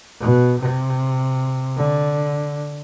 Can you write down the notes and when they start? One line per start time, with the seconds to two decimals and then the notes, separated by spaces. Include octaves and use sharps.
0.20 B2
0.59 C3
1.77 D3